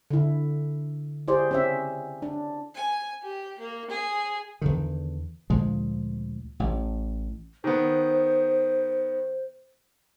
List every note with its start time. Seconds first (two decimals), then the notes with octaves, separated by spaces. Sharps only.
0.11 D3 E4
1.28 E4 G4 G#4 C5 D5
1.51 C4 C#4 E5
2.22 D4
2.75 G#5
3.23 G4
3.59 A#3
3.90 G#4
4.61 E2 D3 D#3
5.50 D2 A#2 F3 G#3
6.60 A1
7.64 D#3 B3 C5